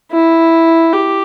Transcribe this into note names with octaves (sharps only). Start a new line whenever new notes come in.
E4
G4